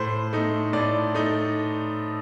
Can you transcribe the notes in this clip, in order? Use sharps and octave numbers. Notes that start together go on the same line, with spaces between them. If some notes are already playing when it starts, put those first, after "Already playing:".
Already playing: A2 C5
A3 D#4
A2 D5
A3 D#4